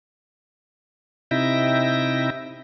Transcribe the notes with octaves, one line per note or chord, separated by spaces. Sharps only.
C3 D#4 E4 E5 G5 A#6